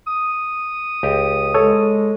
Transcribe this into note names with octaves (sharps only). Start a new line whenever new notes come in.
D#6
C#2 G4
G#3 A4 C#5